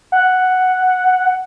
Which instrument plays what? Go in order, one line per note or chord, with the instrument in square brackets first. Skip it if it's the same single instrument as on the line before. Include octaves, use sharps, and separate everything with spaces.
[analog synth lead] F#5